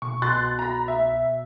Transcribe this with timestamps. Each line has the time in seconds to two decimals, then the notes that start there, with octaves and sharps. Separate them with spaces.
0.02 B2 C#6
0.22 C2 B2 C6 F#6 A6
0.59 A#5 B5
0.88 E5